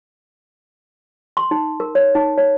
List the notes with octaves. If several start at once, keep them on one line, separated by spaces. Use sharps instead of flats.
C6
D#4
A#4
C#5
D#4
C#5